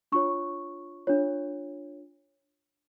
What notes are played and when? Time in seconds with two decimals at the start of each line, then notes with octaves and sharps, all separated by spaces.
0.12 D4 F4 C#5 C#6
1.07 D4 F4 C#5